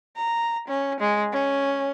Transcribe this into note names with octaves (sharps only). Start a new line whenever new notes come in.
A#5
C#4
G#3
C#4